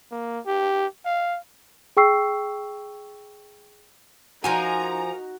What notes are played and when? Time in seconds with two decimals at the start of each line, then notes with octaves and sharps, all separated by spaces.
0.11 A#3
0.47 G4
1.06 F5
1.97 G#4 G5 C#6 E6 C7
4.44 F3 D#4 F#4 A#4 G#5 A#5